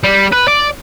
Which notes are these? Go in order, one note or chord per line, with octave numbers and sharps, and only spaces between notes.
G3
B4
D5